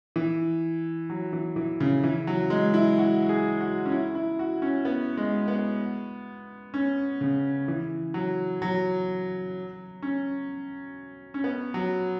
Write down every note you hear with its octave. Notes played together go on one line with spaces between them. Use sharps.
E3
F#3
E3
E3
C#3
E3
F#3
G#3
E4
F#4
G#4
F#4
C#4
E4
E4
F#4
C#4
B3
G#3
B3
C#4
C#3
E3
F#3
F#3
C#4
C#4
B3
F#3